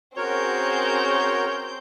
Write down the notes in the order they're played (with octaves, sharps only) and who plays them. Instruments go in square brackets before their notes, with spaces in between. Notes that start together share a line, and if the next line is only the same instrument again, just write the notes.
[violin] C4 G6 [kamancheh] C#4 G#4 [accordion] F#4 A#4 [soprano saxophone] C#5